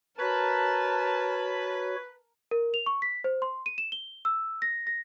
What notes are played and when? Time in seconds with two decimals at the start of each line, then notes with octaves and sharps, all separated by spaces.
0.19 F#4 A#4 B4 C#5 A5
2.51 A#4
2.74 F7
2.86 C#6
3.02 B6
3.24 C5
3.42 C6
3.66 D#7
3.78 E7
3.92 G7
4.25 E6
4.62 A#6
4.87 A#6